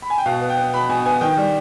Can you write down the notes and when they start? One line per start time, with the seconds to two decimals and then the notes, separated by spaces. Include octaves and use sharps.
0.02 B5
0.10 G#5
0.18 G5
0.26 B2 F5
0.41 B3
0.49 G5
0.58 B3
0.74 B2 B5
0.89 B2 G#5
1.06 B3 G#5
1.21 D#3 G5
1.37 G3